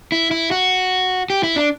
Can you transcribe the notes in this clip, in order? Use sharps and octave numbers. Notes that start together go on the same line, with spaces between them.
E4
E4
F#4
G4
E4
D4